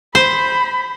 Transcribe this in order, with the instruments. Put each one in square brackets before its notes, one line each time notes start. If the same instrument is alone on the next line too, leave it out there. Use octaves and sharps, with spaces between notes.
[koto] C5 [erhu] B5